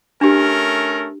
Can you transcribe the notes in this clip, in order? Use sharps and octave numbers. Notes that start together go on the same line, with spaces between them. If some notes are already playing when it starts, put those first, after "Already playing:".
A3 C#4 D4 G4 A#4